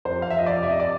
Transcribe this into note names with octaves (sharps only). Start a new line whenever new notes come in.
F2 C5
F5
F3 E5
D#5
D5
C3 E5
D#5
D5